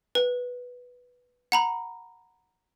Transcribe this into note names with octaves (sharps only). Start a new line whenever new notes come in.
B4
F#5 A#5 B5